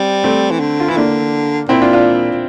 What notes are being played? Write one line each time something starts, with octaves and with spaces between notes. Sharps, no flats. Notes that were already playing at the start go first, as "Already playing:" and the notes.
Already playing: G3 C4
A3 C4
E3
D3
F4
E3 E4
D3 A#3 D4
A#2 C4 E4
D4 F4
D4 F4
A#2